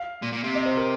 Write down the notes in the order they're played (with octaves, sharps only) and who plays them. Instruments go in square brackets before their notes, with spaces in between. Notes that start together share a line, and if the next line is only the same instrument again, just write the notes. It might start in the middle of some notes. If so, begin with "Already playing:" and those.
Already playing: [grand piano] F5
[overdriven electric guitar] A#2
A#2
C3
[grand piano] D#5
C5
A#4